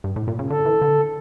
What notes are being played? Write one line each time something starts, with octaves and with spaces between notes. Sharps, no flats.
G2
A2
A#2
C#3
D3 A4
E3
D3